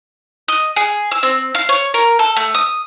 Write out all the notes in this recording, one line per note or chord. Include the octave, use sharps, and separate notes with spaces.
D#5
G#4
E6
C4
F5
C#5
A#4
A4
A3
D#6